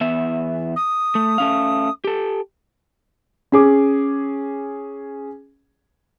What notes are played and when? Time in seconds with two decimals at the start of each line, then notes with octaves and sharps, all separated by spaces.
0.01 E2 B3 E5
0.76 D#6
1.15 A3
1.38 A3 C#4 F5
2.04 G4 A4
3.52 C#4 G#4 D6